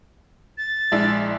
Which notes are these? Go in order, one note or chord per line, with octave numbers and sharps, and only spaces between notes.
A6
A#1 G#3 D4 E4 E5